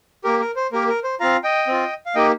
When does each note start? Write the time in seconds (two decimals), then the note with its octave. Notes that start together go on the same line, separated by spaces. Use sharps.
0.24 A#3 G4 A#4
0.40 A#4
0.56 C5
0.72 A#3 G4 A#4
0.88 A#4
1.04 C5
1.20 C4 F4 F5 A#5
1.44 D#5 G5
1.67 C4 F4
2.06 F5
2.15 A#3 D#4 G4 D#5 G5